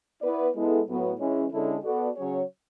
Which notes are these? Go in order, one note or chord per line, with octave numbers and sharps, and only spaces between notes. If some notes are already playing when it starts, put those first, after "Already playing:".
B3 E4 B4 D5
G#3 B3 E4 A4
A2 F#3 B3 F#4
E3 G#3 C#4
D3 G#3 C#4 E4 A4
B3 F#4 A4 D5
C#3 F#3 C#4 G#4 C#5